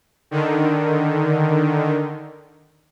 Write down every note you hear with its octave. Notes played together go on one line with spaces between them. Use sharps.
D3 D#3